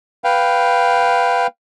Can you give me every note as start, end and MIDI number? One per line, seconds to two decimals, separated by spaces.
0.24 1.47 71
0.24 1.47 77
0.24 1.47 79